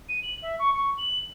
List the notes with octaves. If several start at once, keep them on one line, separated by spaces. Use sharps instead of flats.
D#7
F#7
E5
C#6
C#6
F#7